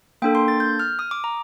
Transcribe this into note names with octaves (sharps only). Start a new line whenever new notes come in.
A#3 D4 A4 G5
C6
A6
G6
F6
D#6
D6
A#5